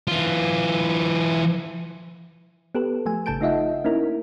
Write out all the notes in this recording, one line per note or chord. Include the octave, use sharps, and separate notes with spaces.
E3 F4
B3 G4 A4 B4
F3 A3 G#5
G#1 C#3 A4 A5 G6 D7
A3 D#4 F4 D#5 E5 F#5
A#3 C#4 D#4 E4 A#4